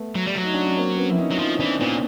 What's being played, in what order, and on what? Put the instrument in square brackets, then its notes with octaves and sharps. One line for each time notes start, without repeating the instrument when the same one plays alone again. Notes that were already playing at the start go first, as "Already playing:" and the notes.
Already playing: [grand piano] A3 B3
[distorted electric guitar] F#3
G3
F#3
[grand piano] D#4
D4
C#4
A#3 C4
B3 C#4
E4
C#4 D#4
[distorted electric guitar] F#3
[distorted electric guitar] F3 [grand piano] C#4 D#4
[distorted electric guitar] E3 [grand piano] C4 D4
[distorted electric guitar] A#2 [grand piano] B3 C#4